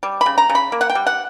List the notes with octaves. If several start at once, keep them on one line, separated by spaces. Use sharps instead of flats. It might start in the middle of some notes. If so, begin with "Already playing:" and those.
G3
B5
C#3
A#5
C#3
B5
A#3
F#5
G5
G3
F#5